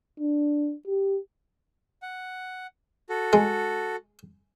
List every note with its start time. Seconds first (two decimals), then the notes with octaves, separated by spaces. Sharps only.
0.20 D4
0.87 G4
2.02 F#5
3.09 F#4 A4
3.33 G#3